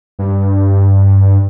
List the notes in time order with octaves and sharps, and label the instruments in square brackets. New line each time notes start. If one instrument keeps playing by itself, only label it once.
[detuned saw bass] G2